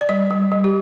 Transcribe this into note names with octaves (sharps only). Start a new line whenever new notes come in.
D5
G3 D#5
G3
G3
G4